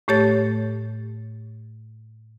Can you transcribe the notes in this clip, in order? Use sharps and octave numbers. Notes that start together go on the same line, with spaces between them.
A2 A3 G4 C#5 A6